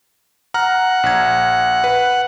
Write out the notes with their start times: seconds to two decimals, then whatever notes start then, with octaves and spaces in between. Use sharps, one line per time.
0.54 F#5 A#5 F6
1.03 A#1 G#6
1.84 B4